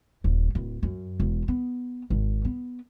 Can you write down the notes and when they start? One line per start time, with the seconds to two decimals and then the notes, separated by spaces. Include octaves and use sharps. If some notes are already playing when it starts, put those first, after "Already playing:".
0.24 D#1
0.55 D1
0.83 F#2
1.20 E1
1.48 B3
2.10 G#1
2.45 B3